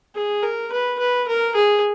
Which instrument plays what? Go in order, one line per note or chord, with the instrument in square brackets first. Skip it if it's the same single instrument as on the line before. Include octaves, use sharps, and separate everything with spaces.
[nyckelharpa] G#4
A#4
B4
B4
A#4
G#4